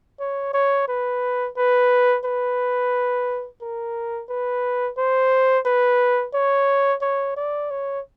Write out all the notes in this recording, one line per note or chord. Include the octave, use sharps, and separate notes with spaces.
C#5
C#5
B4
B4
B4
A#4
B4
C5
B4
C#5
C#5
D5
C#5